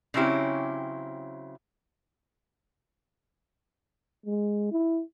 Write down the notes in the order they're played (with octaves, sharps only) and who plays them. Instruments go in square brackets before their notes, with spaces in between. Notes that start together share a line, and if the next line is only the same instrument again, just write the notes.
[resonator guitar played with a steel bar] C#3 F#3 C4 C#4 E4 G4
[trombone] G#3
E4